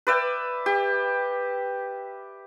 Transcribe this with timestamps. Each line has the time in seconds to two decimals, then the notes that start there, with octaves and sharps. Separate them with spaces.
0.07 B4 D5 E5 G5
0.66 G4